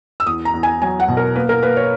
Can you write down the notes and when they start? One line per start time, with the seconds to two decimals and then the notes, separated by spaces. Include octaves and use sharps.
0.20 E6
0.27 E2 D#6
0.45 A#5
0.54 E2
0.63 G#5
0.82 F#3 G#5
1.00 F#5
1.08 B2
1.17 A#4
1.36 A#3 B4
1.49 A#4
1.62 A#3 B4
1.77 C#5